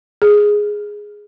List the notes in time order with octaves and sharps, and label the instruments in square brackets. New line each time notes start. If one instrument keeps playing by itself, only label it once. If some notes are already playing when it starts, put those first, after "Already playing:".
[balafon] G#4